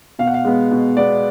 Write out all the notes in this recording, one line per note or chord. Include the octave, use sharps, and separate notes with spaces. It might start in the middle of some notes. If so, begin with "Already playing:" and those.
B2 F5
F#5
F5
G#3 B3
B2
G#3 B3 D5